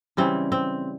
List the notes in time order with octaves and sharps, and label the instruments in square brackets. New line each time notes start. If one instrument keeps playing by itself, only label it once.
[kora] C#3 E3 G3 C4
C4